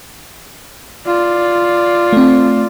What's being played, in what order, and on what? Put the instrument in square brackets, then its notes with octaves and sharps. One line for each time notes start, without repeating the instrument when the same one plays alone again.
[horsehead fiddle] F4 D5
[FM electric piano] A3 C4